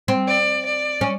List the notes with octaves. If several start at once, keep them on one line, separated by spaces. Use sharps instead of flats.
C4
D5
D5
C#4